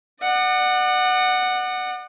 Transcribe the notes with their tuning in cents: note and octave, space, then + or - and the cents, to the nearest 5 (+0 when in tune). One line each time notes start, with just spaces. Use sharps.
D5 +45 F#5 +0